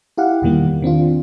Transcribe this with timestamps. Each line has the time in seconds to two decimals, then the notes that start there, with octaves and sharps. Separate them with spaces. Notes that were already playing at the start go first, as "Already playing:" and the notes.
0.18 E4 G4 F5 F#5
0.42 E2 B2 D#3 G3 A#3
0.82 D#3 C4 D4 F4